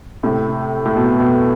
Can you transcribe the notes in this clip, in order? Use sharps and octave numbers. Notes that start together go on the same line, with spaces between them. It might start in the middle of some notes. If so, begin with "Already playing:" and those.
A2 C3
A2
B2
B2